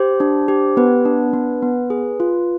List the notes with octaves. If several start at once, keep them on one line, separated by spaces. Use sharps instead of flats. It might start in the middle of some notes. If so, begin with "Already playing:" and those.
Already playing: G4 C5
D4
G4
B3 B4
D4
B3
B3
G#4
F4